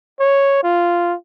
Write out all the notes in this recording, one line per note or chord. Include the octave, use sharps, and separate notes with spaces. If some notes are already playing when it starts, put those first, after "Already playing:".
C#5
F4